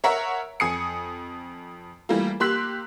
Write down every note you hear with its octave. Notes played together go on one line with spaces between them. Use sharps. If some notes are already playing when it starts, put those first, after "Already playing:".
A#4 C#5 E5 F#5 A#5
F2 G#5 D#6 C7 C#7
E3 G3 A3 A#3 F4
A#3 G4 C6 E6 F#6 B6